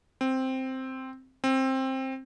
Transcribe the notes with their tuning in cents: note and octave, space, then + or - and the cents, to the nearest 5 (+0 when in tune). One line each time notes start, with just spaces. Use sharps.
C4 +0
C4 +15